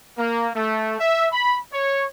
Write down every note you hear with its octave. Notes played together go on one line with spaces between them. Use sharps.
A#3
A3
E5
B5
C#5